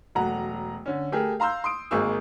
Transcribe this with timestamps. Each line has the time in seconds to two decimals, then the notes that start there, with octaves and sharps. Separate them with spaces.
0.15 E1 F#3 A3 F#5 A#5
0.86 D3 C#4
1.12 A3 G4 G#4 A#4
1.40 F5 A#5 C6 E6 G6
1.64 C6 D#6 D7
1.91 G#1 G#3 A#3 G#4 C#6 E6